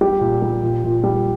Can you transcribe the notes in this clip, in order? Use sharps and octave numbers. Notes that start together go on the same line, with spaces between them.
G3 G4
A#2
G3
A#2
A#2
G3